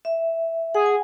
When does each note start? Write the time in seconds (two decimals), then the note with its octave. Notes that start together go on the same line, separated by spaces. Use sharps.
0.05 E5
0.75 G#4 F#5
0.86 G#5